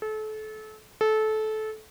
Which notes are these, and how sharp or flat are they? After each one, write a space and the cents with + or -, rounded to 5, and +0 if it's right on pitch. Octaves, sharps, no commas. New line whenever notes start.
A4 -30
A4 -20